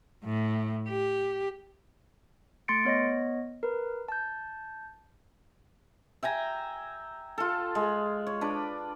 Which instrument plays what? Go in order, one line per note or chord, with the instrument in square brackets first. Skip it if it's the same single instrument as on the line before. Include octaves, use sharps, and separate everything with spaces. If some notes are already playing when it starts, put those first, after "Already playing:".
[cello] A2
G4
[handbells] A3 C6 A6 C#7 D7
B3 C#5 D#5 A#6
A#4 B4
A5 G6
[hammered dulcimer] E5 G5 G#5 A#5
F4 A4
G#3
C#5
D4 B4